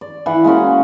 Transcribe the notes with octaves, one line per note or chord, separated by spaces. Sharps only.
D5
E3 F#5
G#3 A#3 C#4 F#4